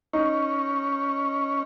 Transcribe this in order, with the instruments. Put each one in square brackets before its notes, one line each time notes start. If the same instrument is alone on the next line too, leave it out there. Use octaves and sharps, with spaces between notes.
[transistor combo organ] C#4 [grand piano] D#4